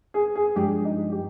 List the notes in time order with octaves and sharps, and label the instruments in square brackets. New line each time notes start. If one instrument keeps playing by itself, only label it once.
[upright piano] G#4
G#4
[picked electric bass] G2 F3 G#3 D4 [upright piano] G4
[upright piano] D#4
G4